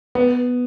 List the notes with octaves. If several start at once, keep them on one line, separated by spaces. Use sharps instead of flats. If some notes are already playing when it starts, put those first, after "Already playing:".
B3